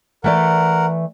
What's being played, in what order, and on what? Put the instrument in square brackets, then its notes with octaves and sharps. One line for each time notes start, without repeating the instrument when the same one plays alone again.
[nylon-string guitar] E3 A3 D5 [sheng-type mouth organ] A#4 F#5